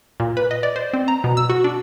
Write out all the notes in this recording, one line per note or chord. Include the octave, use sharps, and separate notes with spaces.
A#2
B4
D#5
D5
C5
C4
A#5
B2
E6
F#4
D4